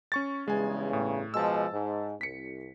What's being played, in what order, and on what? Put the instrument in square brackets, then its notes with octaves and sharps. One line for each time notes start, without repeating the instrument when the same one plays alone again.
[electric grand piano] C#4 C#6 A6
[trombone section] E2 G2 C#3 [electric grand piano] G#3 G#5
[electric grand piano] A2
[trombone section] B2 F3 G#3 [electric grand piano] A5 E6
[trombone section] G#2
[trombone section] C2 [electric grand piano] B6 C#7